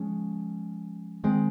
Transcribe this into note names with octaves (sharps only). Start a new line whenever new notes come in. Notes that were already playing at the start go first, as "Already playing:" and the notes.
Already playing: F3 G#3 C#4
D#3 G#3 C4